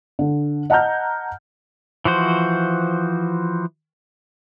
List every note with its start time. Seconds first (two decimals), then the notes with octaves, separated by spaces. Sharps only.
0.19 D3
0.70 D#5 F#5 A5 A#5 F6 G6
2.05 E3 F3 F#4 C5